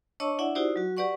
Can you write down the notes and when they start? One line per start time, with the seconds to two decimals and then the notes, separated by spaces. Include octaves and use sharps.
0.20 D4 C#5 D#5 A5 C#6 E6
0.39 D4 E4 D5 E5 F#5
0.55 D#4 E4 F#4 G4 C5 D5
0.76 F#3 F#4
0.97 G4 B4 D5 F#5 C#6